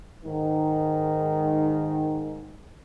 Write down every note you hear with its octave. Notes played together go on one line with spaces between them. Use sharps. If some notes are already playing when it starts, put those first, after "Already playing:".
G#2 D#3